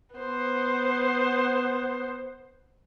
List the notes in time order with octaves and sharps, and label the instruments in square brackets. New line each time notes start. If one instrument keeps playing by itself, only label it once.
[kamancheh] B3 C5